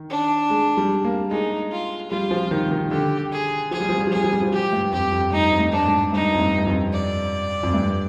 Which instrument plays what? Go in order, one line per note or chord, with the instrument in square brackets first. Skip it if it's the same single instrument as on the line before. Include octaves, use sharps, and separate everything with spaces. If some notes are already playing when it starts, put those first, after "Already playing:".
Already playing: [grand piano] D#3
[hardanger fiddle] D4
[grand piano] G#3
G3
A#3
[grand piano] G#3 [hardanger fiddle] D#4
[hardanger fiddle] F4
[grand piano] G3 [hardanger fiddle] F4
[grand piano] F3
D#3
D#3
[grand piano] D3 [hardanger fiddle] G4
[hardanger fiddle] G#4
[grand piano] F3 [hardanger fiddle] G#4
[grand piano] G3
F3
G3
F3
[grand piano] G3 [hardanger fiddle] G#4
[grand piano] F3
G3
F3
[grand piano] F3 [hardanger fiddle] G4
[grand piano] G2
[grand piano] F2 [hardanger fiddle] G4
[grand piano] F2
[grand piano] G2 [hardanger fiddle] D#4
[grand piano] F2
G2
[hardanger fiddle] D4
[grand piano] G#2
[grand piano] G2 [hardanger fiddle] D#4
[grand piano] F2
G2
G2
F2
[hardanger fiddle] D5
[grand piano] F2
G2